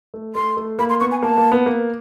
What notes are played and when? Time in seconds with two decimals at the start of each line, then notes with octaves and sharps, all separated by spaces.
0.14 A3
0.35 A3 C6
0.57 A3
0.79 A#3 B5
0.89 C6
1.00 B3 C#6
1.11 G#5
1.23 A#3 A5
1.38 A#3
1.52 B3
1.66 A#3